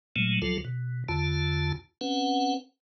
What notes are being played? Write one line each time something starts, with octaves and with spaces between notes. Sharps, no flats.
A#2 F#3 G#3 A3
D2 F3 F#3 F4 A4
B2
E2 D3 F4 A5
C4 C#4 B4 F#5